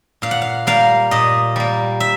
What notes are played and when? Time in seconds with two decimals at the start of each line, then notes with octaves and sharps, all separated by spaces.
0.22 A#2 F5
0.31 F#5
0.42 F5
0.67 G3 A#3 F5
1.11 A#2 D#5
1.56 G3 A#3
2.00 E5